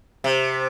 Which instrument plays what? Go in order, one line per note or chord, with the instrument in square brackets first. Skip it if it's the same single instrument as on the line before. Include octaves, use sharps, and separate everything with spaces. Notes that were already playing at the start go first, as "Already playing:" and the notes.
[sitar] C3